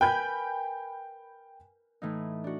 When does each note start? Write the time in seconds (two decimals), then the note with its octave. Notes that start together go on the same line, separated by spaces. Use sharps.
0.01 A#4 B4 G5 G#5 B5 G6
2.02 A2 E3 D#4
2.44 D4 F#4